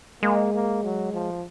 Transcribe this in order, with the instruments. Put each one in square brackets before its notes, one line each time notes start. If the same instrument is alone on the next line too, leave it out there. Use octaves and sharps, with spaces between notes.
[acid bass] G#3 [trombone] A#3
[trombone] A#3
F#3
F3